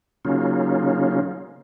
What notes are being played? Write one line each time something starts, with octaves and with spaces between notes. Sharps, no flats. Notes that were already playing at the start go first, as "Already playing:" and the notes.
C#3 F#3 A#3 C#4 D#4 F4